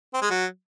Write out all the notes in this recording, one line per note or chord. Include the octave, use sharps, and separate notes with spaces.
C4
G#3
F#3